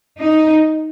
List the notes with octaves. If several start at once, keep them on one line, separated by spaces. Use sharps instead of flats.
D#4